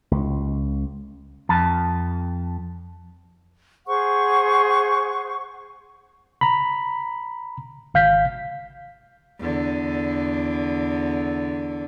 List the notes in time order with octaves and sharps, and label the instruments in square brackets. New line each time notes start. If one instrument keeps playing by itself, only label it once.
[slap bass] C#2
[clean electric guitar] F2 A5
[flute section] G#4 C5 F#5 C#6
[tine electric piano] A#5 B5
G#1 F5 G6 B6
[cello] E2 D3